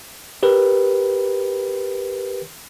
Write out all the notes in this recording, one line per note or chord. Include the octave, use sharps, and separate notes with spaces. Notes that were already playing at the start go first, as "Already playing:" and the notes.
G4 A#4 B4